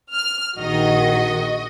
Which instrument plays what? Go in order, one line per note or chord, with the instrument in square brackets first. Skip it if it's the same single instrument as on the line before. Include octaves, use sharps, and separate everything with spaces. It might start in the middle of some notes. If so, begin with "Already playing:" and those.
[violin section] F6
[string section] A#1 D#3 [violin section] F#4 D#5